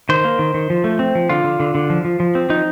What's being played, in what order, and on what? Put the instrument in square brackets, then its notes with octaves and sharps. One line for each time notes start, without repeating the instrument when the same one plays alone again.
[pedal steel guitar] D#3 C5
A#3
D#3
D#3
F3
A3
C4
F3
D3 F4
D3
D3
D3
F3
F3
F3
C4
F3 D#4